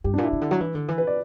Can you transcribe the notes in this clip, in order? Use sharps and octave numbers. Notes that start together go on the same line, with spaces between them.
G2 G4
D4
A#2 E4
C#3
D3
F#3
E3
D3
E3
B4
D5